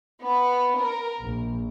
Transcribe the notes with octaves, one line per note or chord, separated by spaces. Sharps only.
B3
A#4
A#1